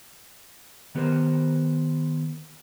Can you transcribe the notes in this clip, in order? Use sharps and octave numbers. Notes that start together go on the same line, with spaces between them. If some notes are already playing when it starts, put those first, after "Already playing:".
D#3 B3 G4 A#4 C5